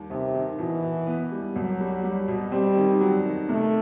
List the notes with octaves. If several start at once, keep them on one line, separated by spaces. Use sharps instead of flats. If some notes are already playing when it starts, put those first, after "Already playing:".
Already playing: D#2 G3
D#2 C3
D#3
B2 E3
B2
B3
G3
C2 F#3
G3
G3
B2
G3 C4
D#3
F#3
D#3
C3 A3